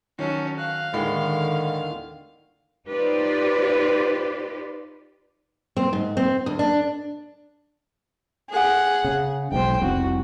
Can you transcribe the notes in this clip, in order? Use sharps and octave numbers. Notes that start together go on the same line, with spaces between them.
D#3 F#3 C#4 A4
F5 F#6
D#2 A2 D3 D#3 G#3
D#4 F4 G4 B4 C5 D5
C4
G#2
C4
D2
D4
G#4 F#5
C#3
B1 G#2 C5 G5
F1 C2 F#4